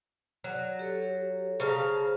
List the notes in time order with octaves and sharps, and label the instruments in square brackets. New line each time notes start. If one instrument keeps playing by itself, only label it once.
[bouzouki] F#3
[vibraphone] G4 A4 C#5
[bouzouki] C#3 F5 A#5 [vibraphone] C5 A5